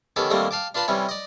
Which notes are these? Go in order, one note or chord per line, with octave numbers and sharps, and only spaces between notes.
D#3 B3 C#4 G4 A4
D#2 G3 A3 A#3 C4
F5 G5 A5 D6
D4 F4 B4 A5 C6
C3 E3 G3 C#4
D5 D#5